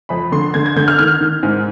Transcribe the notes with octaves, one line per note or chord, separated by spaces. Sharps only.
F2 B5
D3 C6
D3 G#6
G#6
D3 G6
F6
D#3 F6
D#3
G#2